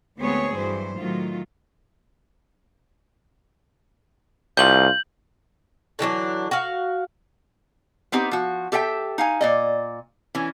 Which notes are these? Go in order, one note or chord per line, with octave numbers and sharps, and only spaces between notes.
D2 G#3 B3 C4 G#4 C#5
G2 E3 F#3 C5
A2 D#3 F#3 F4
C2 G3 F4 G6 F#7
D3 E3 F#3 D4
F#4 F5
B3 C4 D#4 G4
F3 F#4
G4 A4 E5 F#5 G5
D#4 F5 G#5
A#2 D5 D#5
E3 C#4